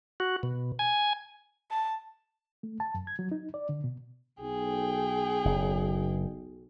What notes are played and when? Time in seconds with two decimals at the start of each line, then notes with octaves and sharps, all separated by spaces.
0.20 F#4
0.43 B2
0.79 G#5
1.71 A5
2.63 A3
2.80 A5
2.94 F#2
3.07 G#6
3.19 F#3
3.32 D#4
3.54 D5
3.69 D3
3.84 B2
4.41 B1 G#4 G5
5.45 F#1